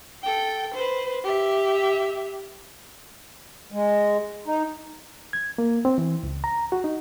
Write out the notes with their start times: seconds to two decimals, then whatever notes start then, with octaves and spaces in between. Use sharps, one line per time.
0.23 A4 G5
0.75 B4 C5
1.24 G4 E5
3.72 G#3
4.46 D#4
5.33 G#6
5.58 A#3
5.85 C4
5.98 E3
6.23 C#2
6.44 A#5
6.72 F#4
6.84 D#4